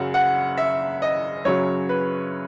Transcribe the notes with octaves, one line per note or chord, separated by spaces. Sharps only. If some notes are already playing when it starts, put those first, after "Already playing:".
Already playing: F#2 C#3 F#3 F#5
F#5
E5
D#5
F#2 C#3 F#3 C#5
B4